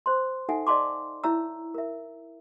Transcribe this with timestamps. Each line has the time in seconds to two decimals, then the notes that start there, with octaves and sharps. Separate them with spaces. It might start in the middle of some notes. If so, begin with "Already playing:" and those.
0.06 C5 C6
0.49 D#4 A4 E5 F#5 G#5
0.67 D5 D#5 F5 A5 C6 D6
1.24 E4 C#5 E5 A#5 E6
1.74 A#4 E5